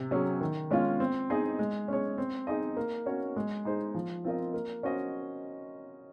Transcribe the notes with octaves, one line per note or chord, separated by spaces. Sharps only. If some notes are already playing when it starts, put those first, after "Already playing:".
Already playing: C3
F#3 C#4 G#4
D#3
G#3 C#4 F4
C4
D#4 G#4 D#5
G#3
C#4 G#4 C#5
C4
D#4 G#4 D#5
A#3
C#4 F#4 C#5
G#3
D#4 G#4 C5
F3
C4 F4 A#4 D#5
A#3
C#4 F#4 C5 D#5